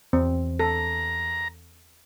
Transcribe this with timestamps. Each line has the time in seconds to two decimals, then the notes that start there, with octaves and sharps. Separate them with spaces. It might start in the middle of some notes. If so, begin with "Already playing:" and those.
0.13 E2 C4
0.60 A4 A#5